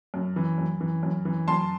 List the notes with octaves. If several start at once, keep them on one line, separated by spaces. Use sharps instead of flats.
F#2
E3
F#2
E3
F#2
E3
F#2 A5 C6